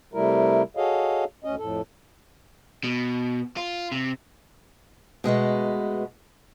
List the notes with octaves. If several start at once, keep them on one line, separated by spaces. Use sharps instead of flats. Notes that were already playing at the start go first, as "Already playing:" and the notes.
C3 G3 A3 E4 A#4
F#4 G#4 A4 C#5 D#5 F5
D2 C#4 D#5
F2 A2 A4
B2
F4
C3
B2 G#3 A3 B3